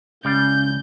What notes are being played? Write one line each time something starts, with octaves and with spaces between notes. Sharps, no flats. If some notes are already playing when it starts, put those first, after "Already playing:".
C#2 G3 C#4 D5 F5 G6